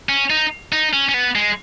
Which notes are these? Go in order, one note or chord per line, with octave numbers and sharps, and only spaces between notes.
C#4
D#4
D#4
C#4
C#4
B3
G#3